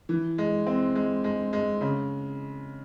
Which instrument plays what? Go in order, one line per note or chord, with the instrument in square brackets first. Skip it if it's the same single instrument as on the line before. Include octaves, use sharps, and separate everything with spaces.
[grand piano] E3
G#3
C4
G#3
G#3
G#3
C#3